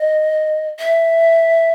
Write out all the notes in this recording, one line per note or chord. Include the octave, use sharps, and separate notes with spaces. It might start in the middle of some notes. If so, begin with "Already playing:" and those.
Already playing: D#5
E5